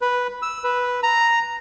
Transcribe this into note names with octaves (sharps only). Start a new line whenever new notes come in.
B4
E6
B4
A#5